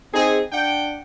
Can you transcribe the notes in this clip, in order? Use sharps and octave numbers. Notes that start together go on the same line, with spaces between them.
C4 D#4 G#4
D4 F#5 G5